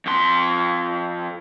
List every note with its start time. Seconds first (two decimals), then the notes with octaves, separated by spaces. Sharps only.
0.06 F2 C6